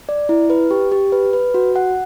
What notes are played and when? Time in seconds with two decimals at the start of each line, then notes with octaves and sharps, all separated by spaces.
0.09 D5
0.29 E4
0.50 B4
0.71 G4
0.92 G4
1.12 B4
1.33 B4
1.54 F#4
1.76 F#5